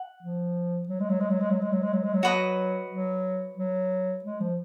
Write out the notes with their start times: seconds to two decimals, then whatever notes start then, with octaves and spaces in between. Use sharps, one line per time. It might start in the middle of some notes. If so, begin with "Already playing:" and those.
Already playing: F#5
0.23 F3
0.89 F#3
1.00 G#3
1.10 F#3
1.20 G#3
1.30 F#3
1.40 G#3
1.51 F#3
1.61 G#3
1.72 F#3
1.83 G#3
1.93 F#3
2.04 G#3
2.14 F#3
2.23 F#4 B4 D#5
2.91 F#3
3.57 F#3
4.24 G#3
4.41 F3